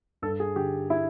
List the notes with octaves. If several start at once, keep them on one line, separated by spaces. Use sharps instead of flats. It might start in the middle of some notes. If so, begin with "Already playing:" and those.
G2 A4
G#4
D3 G4
E4